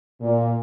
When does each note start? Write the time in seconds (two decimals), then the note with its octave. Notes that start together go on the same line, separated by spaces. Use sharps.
0.21 A#2